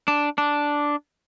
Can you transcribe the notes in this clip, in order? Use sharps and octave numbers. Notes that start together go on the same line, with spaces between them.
D4
D4